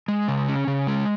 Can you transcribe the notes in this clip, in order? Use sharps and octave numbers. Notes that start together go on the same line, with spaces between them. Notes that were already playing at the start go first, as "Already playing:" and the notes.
G#3
C#3
C#4
C#3
G#3